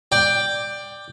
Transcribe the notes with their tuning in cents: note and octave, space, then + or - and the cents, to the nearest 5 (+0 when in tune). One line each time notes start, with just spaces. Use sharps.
D5 +10 G5 +5